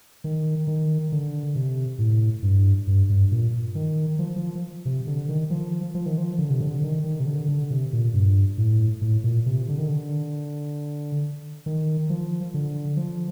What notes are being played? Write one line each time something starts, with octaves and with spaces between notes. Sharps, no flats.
D#3
D#3
D3
C3
A2
G2
G2
G2
A#2
D#3
F3
F3
C3
D3
D#3
F3
F3
D#3
F3
D3
C3
D3
D#3
D#3
C3
D3
D3
C3
A#2
G2
A2
A2
A#2
C3
D3
D#3
D3
D#3
F3
D3
F3